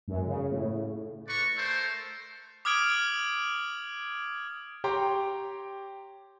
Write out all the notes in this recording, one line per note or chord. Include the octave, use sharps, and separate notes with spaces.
F#2
C#3
A2
B4 D5 A#5 C#6
A3 A4 A#4 C5
D6 D#6 F6 G#6 D7 F#7
G4 C#5 G5 A#5 C6